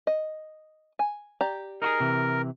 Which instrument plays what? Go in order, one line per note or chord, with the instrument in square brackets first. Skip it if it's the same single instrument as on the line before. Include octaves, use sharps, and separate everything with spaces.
[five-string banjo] D#5
G#5
G4 D5 A#5
[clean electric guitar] D#4 F#4 G#4 [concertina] A#4
[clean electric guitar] C3 E3